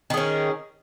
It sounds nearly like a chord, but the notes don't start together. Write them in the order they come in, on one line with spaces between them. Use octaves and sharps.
D#3 G#4 C#4